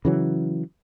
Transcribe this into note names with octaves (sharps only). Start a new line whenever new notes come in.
C#3 E3 F#3